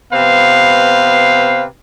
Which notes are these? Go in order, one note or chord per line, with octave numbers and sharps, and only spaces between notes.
C3 B3 B4 C5 F5